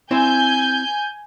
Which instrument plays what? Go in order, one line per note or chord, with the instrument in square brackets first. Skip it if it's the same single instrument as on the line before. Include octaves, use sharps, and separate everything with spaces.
[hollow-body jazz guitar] C4 E4 C5 [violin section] G#5 G6